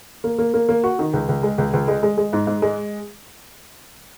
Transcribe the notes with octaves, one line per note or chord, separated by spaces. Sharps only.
A#3
A#3
A#3
A#3
F#4
D#3
C#2
C#2
G#3
C#2
C#2
G#3
G#3
G#3
G#2
G#2
G#3